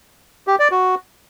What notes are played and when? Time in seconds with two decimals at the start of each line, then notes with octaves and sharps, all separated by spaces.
0.47 G4
0.59 D5
0.71 F#4